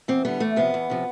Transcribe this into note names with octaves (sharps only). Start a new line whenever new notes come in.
E2 C4
D3 G3 B3
E2 A3
C3 F3 B3
E2
C3 F3